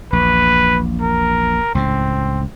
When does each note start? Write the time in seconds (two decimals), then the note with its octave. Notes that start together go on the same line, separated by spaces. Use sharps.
0.13 A#1 E2 B4
1.01 A#4
1.75 C#2 A2 C4